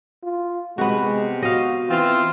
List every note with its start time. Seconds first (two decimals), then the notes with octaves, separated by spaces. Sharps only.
0.23 F4
0.78 C3 G#3 B3 F#4
1.42 F#4 D#5 F5
1.90 E3 C4 F4